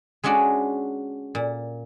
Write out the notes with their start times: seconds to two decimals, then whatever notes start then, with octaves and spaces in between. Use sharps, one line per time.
0.24 G#3 C#4 D4 F#4 D5
1.35 A#2